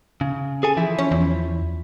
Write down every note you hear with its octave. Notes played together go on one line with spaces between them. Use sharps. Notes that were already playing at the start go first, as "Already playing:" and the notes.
C#3
G#4 A4 G#5
E3 F3 E4
C#4
E2